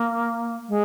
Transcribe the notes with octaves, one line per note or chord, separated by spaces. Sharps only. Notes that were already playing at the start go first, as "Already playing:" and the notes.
Already playing: A#3
G#3